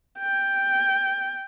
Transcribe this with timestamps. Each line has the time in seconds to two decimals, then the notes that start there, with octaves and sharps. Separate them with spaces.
0.19 G5